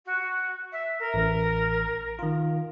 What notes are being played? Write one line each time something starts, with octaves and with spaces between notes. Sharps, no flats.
F#4
E5
A#4
A1
D#3 F4